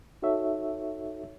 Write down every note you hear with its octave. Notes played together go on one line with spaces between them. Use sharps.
D#4 F#4 A4 C#5 E5